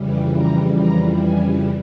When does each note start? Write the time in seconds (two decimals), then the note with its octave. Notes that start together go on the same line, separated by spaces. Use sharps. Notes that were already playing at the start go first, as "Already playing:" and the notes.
Already playing: F2 C#3 E3 G3
0.35 A#5
0.79 A#5
1.24 G#5